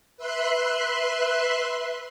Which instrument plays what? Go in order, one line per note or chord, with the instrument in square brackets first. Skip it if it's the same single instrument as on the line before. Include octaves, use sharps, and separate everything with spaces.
[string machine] B4 E5 C6 F#6